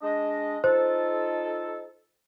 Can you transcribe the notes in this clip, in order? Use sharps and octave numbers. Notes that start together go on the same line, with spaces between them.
G#3 D4 D#5
D#4 F4 A4 C5